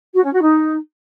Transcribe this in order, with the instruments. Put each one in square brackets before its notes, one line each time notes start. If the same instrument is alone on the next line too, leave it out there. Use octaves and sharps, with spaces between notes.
[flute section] F#4
C#4
F#4
D#4